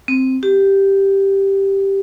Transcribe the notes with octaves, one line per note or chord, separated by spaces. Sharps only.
C4
G4